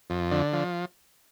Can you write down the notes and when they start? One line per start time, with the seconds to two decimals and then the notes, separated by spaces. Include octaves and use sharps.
0.10 F2
0.31 D3
0.53 F3